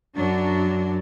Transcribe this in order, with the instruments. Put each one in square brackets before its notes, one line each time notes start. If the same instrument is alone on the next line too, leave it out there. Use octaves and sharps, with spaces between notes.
[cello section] F#2 F#3 D4